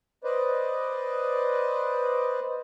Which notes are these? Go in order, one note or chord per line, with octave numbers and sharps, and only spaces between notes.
B4 C5 D5 D#5